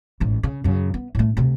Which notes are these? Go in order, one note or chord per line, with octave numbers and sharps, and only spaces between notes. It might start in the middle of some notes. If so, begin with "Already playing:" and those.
A1 G#2
C#3
F#2 C#3
B3
A2 A3
D2 C3